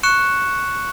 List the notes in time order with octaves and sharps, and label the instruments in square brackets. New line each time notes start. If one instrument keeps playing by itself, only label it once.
[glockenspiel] C#6 F#6 C#7 E7